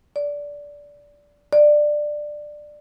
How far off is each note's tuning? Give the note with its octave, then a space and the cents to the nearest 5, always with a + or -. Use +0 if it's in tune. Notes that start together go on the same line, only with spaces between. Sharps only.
D5 -15
D5 +15